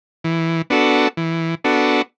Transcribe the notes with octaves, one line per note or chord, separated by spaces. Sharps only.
E3
B3 D4 F#4 A4
E3
B3 D4 F#4 A4